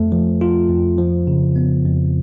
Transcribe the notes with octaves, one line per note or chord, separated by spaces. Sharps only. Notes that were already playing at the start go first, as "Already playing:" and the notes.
Already playing: F2 A3
F3
F4
F2
F3
C#3
B3
F2